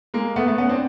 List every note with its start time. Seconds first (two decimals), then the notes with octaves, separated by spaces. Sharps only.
0.14 G#3 A#3
0.36 A3 B3
0.47 A3 B3
0.58 B3 C#4
0.69 C4 D4